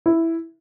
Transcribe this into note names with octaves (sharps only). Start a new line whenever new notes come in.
E4